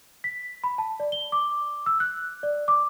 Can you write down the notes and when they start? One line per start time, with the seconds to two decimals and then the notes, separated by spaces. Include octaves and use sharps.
0.24 B6
0.64 B5
0.78 A5
1.00 D5
1.12 G7
1.32 D6
1.86 E6
2.00 F#6
2.43 D5
2.68 D6